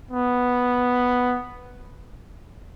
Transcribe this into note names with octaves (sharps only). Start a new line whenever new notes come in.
B3